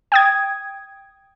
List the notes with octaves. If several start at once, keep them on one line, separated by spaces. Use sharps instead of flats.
G5 D#6 G#6